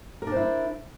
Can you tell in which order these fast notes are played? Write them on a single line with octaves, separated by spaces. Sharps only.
A#4 D4 C5 E4